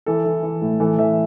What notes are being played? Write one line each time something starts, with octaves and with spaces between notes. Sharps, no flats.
E3 A4
E3
E3
A2
E3 A4
E3 E5